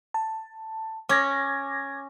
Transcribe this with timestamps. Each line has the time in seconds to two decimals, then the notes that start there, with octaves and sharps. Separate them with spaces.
0.14 A5
1.09 C#4 D6 G#6 A#6